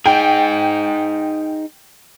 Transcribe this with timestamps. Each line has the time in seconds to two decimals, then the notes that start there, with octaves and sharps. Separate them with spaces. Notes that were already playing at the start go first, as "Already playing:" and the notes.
0.06 D#4 G#4 G5